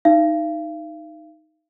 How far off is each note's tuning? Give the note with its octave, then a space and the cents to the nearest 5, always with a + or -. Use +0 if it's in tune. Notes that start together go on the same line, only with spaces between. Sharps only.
D#4 +0 F5 -40